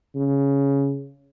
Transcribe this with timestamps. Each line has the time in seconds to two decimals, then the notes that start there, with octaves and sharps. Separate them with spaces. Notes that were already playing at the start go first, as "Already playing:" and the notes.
0.15 C#3